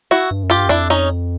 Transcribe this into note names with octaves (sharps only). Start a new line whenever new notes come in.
E4 F#4
G2
F#2
F4 G4
G2
F#2
F2 D4 E4
C#4 D#4